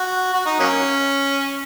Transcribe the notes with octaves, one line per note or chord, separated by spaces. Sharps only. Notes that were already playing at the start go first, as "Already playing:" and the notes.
Already playing: F#4
F#4
D#4
F#3 A#3 C#4